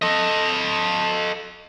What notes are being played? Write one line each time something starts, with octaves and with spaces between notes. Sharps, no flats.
A4 D#5